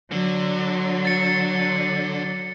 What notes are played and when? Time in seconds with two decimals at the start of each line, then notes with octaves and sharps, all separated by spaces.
0.12 D3 F#3
1.05 A6 C#7